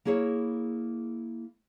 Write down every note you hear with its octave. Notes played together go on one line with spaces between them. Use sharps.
A#3 E4 G#4 A#4 C#5